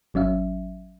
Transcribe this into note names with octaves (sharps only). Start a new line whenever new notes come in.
G#1 F#3 C#4 E5 F5